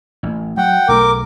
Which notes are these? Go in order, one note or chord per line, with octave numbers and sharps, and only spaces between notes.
A1
F#3 F#5 G5
B1 F3 A3 A#4 D6